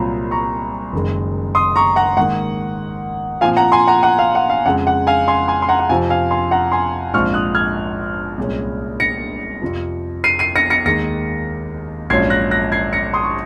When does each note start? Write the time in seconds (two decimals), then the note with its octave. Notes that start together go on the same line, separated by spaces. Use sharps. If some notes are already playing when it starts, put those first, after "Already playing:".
Already playing: C2 A#2 F#3 C4 F4 A#5
0.31 A#5 C#6
0.93 F#1 F#2 D#3 G#3
1.55 C6 D#6
1.76 A#5 C#6
1.96 F#5 A#5
2.17 G#2 D#3 A#3 F#5
3.41 A#2 F3 C4 F4 F5 G#5
3.57 F#5 A#5
3.72 G#5 C6
3.87 F#5 A#5
4.03 F#5
4.19 F5
4.35 F#5
4.50 F5
4.65 F2 C#3 G#3 F#5
4.87 F#5
5.07 F5 G#5
5.28 G#5 C6
5.48 G#5 C6
5.62 C6
5.69 F#5 A#5
5.79 F#5
5.89 F2 C3 F3 F5 G#5
6.10 F5 G#5
6.31 G#5 C6
6.51 F#5 A#5
6.72 G#5 C6
7.13 A#1 G#2 F3 C4 F4 C#6 F6
7.34 D#6 F#6
7.55 F6 G#6
8.37 C2 A#2 G#3 C#4
9.00 A#6 C#7
9.62 F2 C3 F3
10.24 C7 D#7
10.39 C7 D#7
10.56 A#6 C#7
10.70 A#6 C#7
10.85 D#2 D#3 G#3 A#6 C#7
12.10 A#1 G#2 F#3 C#4 F4 G#6 C7
12.30 F#6 A#6
12.51 F#6 A#6
12.72 G#6 C7
12.93 A#6 C#7
13.14 C6 D#6
13.24 C#6